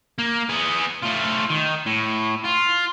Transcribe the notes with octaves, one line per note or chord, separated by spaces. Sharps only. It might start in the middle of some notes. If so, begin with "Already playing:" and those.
A#3
B3 G#4
A3 F4
D#3
A2
F4